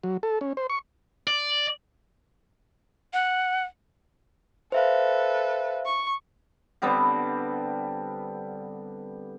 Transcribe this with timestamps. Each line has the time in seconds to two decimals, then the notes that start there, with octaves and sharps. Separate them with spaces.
0.03 F#3
0.23 A4
0.41 C#4
0.57 C5
0.70 C#6
1.28 D5
3.13 F#5
4.72 A4 B4 C5 E5 F5
5.85 C#6
6.82 D3 G3 B3 C4